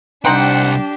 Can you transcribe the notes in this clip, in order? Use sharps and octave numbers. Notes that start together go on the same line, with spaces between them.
C2 C4 D4 D#4 G4 C5 F#5 G5